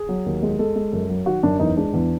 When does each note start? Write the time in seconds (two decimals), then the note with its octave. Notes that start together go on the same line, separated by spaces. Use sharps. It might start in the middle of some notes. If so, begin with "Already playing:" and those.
Already playing: G#4
0.09 F#3
0.26 D#2
0.43 G#3
0.59 G#3 A4
0.76 G#3
0.93 F#2
1.09 F#3
1.26 D#3 F#4
1.43 F#2 D4
1.60 E2 D#4
1.77 G#3 D4
1.93 E2